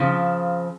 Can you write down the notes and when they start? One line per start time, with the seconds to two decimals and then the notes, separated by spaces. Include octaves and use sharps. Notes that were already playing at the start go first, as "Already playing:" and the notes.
Already playing: C#3 F3 C4